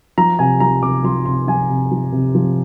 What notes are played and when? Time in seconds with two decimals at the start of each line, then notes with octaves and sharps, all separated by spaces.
0.18 F3 A#5
0.39 C3 G#5
0.60 F3 A#5
0.82 C3 D6
1.04 F3 C6
1.25 C3 C6
1.48 F3 G#5
1.70 C3
1.91 F3
2.12 C3
2.35 F3